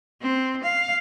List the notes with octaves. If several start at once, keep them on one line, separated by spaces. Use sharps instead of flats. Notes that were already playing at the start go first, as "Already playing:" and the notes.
C4
F5